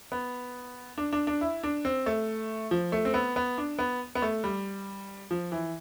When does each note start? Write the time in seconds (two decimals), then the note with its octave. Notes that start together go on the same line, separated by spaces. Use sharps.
0.12 B3
0.98 D4
1.13 D4
1.27 D4
1.41 E4
1.63 D4
1.85 C4
2.06 A3
2.71 F3
2.92 A3
3.05 C4
3.14 B3
3.36 B3
3.58 D4
3.79 B3
4.15 B3
4.22 A3
4.44 G3
5.31 F3
5.52 E3